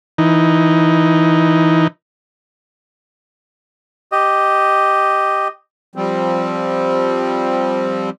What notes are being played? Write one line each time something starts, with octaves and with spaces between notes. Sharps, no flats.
E3 D#4
G4 D#5
F3 G3 C4